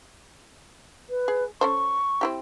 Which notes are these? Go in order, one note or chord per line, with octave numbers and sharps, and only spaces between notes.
B4
G#4
C#4 A4 C5 C#6
C4 E4 G4